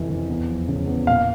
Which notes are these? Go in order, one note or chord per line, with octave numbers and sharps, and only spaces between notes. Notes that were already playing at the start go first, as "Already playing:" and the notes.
Already playing: F2 C3 E3 C#4
E3
E2
F3
C#3
E2
A#2 F5